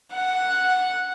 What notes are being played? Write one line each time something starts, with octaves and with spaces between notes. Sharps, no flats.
F#5